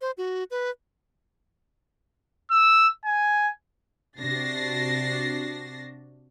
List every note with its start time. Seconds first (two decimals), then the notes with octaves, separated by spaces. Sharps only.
0.01 C5
0.18 F#4
0.51 B4
2.51 E6
3.05 G#5
4.19 C3 D4 F#4 A6 A#6 C7